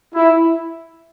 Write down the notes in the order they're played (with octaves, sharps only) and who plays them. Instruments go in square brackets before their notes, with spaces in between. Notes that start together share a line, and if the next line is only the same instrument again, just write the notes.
[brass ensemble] E4